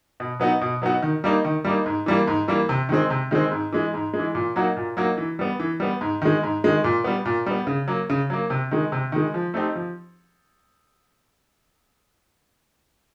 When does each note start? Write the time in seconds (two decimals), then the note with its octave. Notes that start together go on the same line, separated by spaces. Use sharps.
0.20 B2
0.40 F#3 B3 D#4 F#4
0.61 B2
0.82 F#3 B3 D#4 F#4
1.02 D#3
1.24 G3 A#3 D#4
1.45 D#3
1.64 G3 A#3 D#4
1.86 G#2
2.06 E3 G3 A#3
2.27 G#2
2.48 E3 G3 A#3
2.69 C3
2.89 D#3 G#3 C4
3.10 C3
3.31 D#3 G#3 C4
3.52 G#2
3.72 E3 G#3
3.94 G#2
4.14 G#3
4.19 E3
4.35 A#2
4.56 F#3 A#3 D#4 F#4
4.77 A#2
4.97 F#3 A#3 D#4 F#4
5.17 E3
5.39 G3 B3
5.60 E3
5.80 G3 B3
6.01 G#2
6.22 D#3 G#3
6.43 G#2
6.64 D#3 G#3
6.84 A#2
7.04 G3 B3
7.25 A#2
7.46 G3 B3
7.67 C#3
7.88 F#3 A#3
8.10 C#3
8.30 F#3 A#3
8.50 C3
8.71 D#3 G#3
8.92 C3
9.12 D#3 G#3
9.34 F3
9.54 A3 C4 D#4 G4
9.75 F3